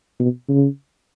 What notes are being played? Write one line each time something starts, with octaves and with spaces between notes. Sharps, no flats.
B2
C#3